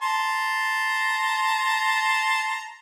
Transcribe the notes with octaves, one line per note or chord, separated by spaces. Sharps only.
A5 A#5 C6